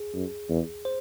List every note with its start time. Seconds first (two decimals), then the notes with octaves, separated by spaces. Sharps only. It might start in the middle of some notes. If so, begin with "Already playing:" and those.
Already playing: G#4
0.14 F#2
0.49 E2
0.85 C5